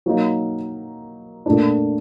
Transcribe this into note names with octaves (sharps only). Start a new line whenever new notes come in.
F#3 A#3 D#4
A#2 A3 D4